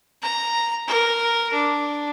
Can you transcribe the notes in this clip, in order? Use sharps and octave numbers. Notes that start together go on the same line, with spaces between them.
A#5
A#4
D4